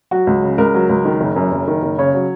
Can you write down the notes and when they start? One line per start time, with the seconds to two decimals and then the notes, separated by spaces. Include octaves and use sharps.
0.11 F#3 F#4
0.27 C#2
0.43 C#3
0.58 C#2 A#4
0.74 F#3
0.89 C#2
1.05 D#3
1.21 F#1
1.36 F#2
1.52 F#1
1.68 D#3
1.83 F#1
1.98 C#3 C#5
2.14 F#3